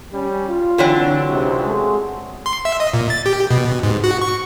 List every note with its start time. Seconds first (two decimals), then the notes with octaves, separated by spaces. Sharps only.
0.12 G3 C#4
0.48 F4
0.78 D3 E3 F#3 C4 D4
1.28 C#2 C3
1.62 G#3 A3
2.46 C6
2.65 E5
2.80 D#5
2.94 A#2
3.10 A6
3.26 G4
3.51 B2
3.83 G#2
4.04 F#4
4.22 C#6